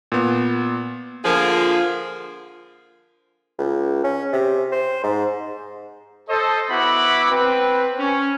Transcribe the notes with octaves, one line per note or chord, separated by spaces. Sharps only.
A#2 B3
D3 F3 A#3 F4 G#4
C#2
C#4
C3
C5
G#2
A4 C5 D#5
B3 E4 F#4 F#5 B5 D6
C4 B4
C#4